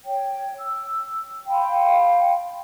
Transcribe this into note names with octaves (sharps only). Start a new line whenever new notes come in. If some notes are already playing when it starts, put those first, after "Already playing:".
C#5 G5
E6
F5 G5 B5 C6